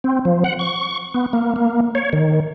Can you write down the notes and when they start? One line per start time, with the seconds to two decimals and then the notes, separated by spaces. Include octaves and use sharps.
0.04 C4
0.25 F3
0.44 F#5
0.59 C#6
1.14 B3
1.33 A#3
1.56 A#3
1.95 C#5
2.13 D#3